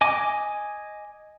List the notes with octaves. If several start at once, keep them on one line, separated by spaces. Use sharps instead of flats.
D#5 G#5 D6